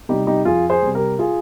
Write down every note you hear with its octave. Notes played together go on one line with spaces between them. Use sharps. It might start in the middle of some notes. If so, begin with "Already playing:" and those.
C3 G3 D#4 G4
D#4 G4
F2 F4 G#4
G#4 C5
C3 G3
G4 A#4
F4 G#4